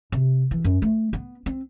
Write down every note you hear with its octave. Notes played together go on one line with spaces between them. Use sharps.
C3
E3
F#2
A3
B3
C4